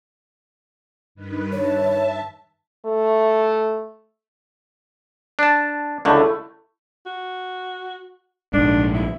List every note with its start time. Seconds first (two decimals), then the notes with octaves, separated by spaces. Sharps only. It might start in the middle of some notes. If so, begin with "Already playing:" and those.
1.15 G2 D#3 B4
1.53 C#5 E5 A5
2.85 A3
5.39 D4 A5
6.05 C#2 D3 A3 E4
7.06 F#4
8.54 A#1 G#2 D4
8.94 E4